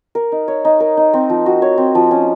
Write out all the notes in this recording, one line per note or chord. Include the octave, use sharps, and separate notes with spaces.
A#4
D#4
C#5
D#4
A#4
D#4
C4
F3
F#4
C#5
C4
F3
C#4